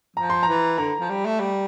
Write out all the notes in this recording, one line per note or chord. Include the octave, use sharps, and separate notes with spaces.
F3 A#5
C6
E3 A#5
D3 A#5
F3
G3
A3
G3